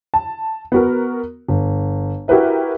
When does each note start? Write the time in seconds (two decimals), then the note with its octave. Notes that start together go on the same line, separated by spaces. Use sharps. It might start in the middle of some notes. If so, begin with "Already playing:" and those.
0.14 A5
0.72 B3 F#4 A#4
1.49 G1
2.28 E4 F#4 G4 A#4 B4 E5